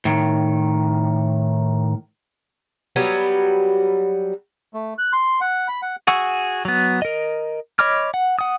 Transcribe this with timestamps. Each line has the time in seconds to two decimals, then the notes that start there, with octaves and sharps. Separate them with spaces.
0.05 A2 D#3
2.96 F#3 G3 B3
4.74 A3
4.98 F#6
5.13 C6
5.41 F#5
5.68 B5
5.82 F#5
6.07 F#4 G#4 F#5 C#6 E6
6.65 F#3 B3
7.02 A#4 D#5
7.79 C#5 D#5 B5 D6 F6
8.14 F#5
8.39 F#5 D#6